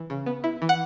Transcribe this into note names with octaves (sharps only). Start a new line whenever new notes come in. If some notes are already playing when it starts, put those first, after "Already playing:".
Already playing: E3
C#3
B3
E4
E3
F#5